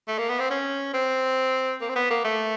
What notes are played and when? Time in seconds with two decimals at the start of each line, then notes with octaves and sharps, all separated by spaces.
0.08 A3
0.18 A#3
0.29 B3
0.40 C4
0.50 C#4
0.94 C4
1.81 A#3
1.89 C4
1.96 B3
2.10 A#3
2.24 A3